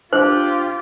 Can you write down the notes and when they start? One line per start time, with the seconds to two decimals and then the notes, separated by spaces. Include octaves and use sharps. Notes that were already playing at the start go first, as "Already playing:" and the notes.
0.13 D4 F4 G4 C5